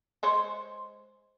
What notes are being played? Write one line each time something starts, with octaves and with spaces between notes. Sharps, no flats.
G#3 C5 C#5